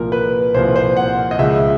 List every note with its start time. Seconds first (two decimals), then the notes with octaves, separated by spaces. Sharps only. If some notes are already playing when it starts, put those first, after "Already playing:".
Already playing: C2 A#2 F3 A#4
0.12 B4
0.54 C2 A#2 F3 C5
0.76 C5
0.97 F#5
1.31 D#5
1.39 C#2 C#3 F3 E5